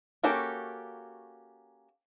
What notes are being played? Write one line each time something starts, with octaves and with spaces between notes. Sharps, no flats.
A#3 C#4 F#4 G4 A4